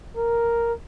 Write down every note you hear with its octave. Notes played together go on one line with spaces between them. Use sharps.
A#4